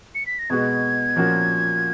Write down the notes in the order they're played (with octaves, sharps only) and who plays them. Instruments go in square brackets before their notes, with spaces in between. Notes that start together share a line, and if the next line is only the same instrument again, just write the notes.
[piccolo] C#7
B6
A#6
[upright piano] B2 G#3 B3 F#4 [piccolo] G#6
[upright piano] A#2 F3 A#3 C#4 F#4